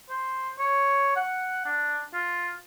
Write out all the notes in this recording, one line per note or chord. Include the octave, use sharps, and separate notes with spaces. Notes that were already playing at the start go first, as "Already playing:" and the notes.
C5
C#5
F#5
D4
F4